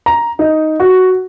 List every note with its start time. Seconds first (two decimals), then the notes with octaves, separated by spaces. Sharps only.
0.06 A#5
0.39 D#4
0.80 F#4